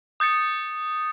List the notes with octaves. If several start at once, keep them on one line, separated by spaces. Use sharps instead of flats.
D#6 G6 A6 C#7